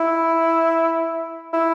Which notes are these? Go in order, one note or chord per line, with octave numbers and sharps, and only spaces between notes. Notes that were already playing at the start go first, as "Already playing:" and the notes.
Already playing: E4
E4